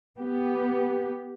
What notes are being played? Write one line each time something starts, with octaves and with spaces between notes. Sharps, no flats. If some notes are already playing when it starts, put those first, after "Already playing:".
B3 G4